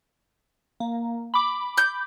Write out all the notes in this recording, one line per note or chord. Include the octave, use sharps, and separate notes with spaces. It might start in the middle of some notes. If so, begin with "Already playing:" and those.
A#3
B5 D6
G6